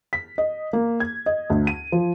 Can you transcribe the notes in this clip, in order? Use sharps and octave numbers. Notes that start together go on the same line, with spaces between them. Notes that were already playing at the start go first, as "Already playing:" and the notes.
B6
D#5
A#3
G#6
D#5
D2
D#7
F3